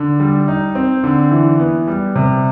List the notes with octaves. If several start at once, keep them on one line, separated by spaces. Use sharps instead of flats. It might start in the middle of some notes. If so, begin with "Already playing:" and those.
Already playing: D3
G3
D#4
C4
D3
E3
B3
G3
C3